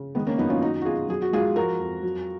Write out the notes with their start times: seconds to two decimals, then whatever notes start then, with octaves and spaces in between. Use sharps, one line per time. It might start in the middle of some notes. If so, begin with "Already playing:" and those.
Already playing: C#3
0.15 D#3 G#3 B3
0.27 A#3 C#4
0.38 F#2 B3 D#4
0.50 C#4 F4
0.61 F#3 D#4 F#4
0.81 F#4
0.85 B2 F4 G#4
1.09 F#3 G#4
1.22 F#4
1.33 G#2 F4 G#4
1.56 F3 F#4 A#4
1.80 F2
2.03 F#3